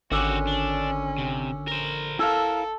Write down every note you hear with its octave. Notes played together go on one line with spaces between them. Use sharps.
G#1 D3 C#4 F#4 G4
D4
C3
A#4 C5
E4 A4 F5